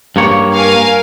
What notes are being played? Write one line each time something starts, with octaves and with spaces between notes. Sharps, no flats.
G2 A#3 C#5
A#4 F5 G#5